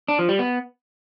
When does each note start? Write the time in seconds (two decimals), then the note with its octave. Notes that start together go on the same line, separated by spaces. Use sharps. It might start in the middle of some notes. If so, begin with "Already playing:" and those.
0.08 D4
0.19 F3
0.29 G3
0.39 B3